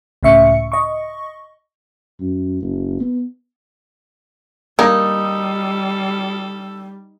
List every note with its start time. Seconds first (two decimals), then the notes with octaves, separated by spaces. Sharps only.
0.23 C#2 A2 C#3 E5 C#6 C#7
0.72 D#5 C#6
2.20 F#2
2.62 F#1
3.00 B3
4.79 G3 A#3 D#4 A4